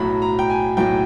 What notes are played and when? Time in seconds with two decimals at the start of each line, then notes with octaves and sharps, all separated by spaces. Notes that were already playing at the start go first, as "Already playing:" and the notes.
Already playing: B1 A2 F#3 B5
0.22 A#5
0.39 G5
0.50 G#5
0.77 B1 A2 F#3 G5